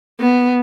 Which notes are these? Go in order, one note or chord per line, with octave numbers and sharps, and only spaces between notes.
B3